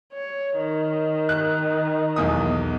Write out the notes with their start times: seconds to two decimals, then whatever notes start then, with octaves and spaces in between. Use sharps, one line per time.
0.13 C#5
0.57 D#3
1.29 F#6
2.16 B1 E2 D#6